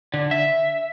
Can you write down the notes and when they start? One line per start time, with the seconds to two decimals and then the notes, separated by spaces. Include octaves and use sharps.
0.14 D3
0.31 E5